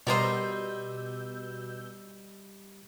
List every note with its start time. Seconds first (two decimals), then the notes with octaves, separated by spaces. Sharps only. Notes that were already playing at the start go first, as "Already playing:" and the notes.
0.07 B2 G3 B3 A#4 C5 D#5 E6 G6